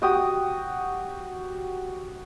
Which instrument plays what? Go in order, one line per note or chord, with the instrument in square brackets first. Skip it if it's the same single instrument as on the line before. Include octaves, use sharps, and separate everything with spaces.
[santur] F#4 G4 D#6